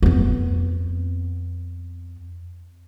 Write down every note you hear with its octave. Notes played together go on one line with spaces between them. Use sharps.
F2 B3